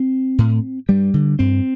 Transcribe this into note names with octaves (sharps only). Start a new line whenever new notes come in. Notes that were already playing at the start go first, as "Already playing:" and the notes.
Already playing: C4
A2
G2 G3
D3
G2 C4